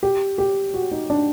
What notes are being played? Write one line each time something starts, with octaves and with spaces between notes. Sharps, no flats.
G4
G4
F#4
D#4
D4